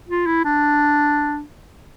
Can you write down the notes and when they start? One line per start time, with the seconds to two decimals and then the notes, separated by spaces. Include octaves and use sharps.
0.09 F4
0.27 E4
0.45 D4